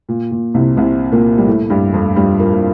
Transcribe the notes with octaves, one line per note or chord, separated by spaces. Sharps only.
A#2
A#2
C2 C3
C2 C3
A#2 A#3
G3
A2 A3
G2 G3
F2 F3
G2 G3
A#2 A#3
A#3